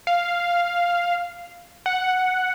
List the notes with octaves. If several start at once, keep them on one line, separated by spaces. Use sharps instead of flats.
F5
F#5